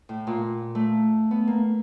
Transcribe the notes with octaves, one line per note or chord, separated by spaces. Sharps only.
A2
A#2
A3
B3
A#3